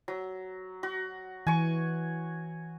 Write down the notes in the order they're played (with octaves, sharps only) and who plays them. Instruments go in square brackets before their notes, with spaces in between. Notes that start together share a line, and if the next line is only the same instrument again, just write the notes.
[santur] F#3
F#4
[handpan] E3 [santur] G#5 C#6